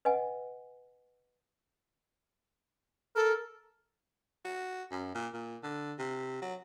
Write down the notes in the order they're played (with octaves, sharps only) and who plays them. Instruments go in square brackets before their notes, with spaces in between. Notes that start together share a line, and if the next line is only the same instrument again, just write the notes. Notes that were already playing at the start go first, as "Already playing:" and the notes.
[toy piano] B4 D#5 F#5 G#5
[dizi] A4 [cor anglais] A#4
[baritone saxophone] F#4
F#2
A#2
A#2
D3
C3
F#3